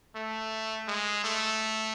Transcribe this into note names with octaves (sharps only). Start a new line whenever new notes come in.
A3
G#3
A3